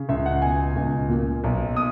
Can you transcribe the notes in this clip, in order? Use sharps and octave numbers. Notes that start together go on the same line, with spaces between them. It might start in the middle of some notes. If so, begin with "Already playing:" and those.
Already playing: C#3
C#2 E5
F#5
B2 G#5
C#2
A#2
B1
D#6